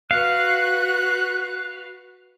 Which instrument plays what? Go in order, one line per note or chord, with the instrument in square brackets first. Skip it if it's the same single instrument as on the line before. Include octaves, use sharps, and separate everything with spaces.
[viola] F#4 B4 [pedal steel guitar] F5 [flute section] F#6